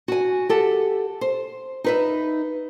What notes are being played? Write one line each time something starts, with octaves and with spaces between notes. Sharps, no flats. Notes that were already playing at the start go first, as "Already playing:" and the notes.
F#4 G#5
G4 A4 F#5
C5
D#4 B4 E5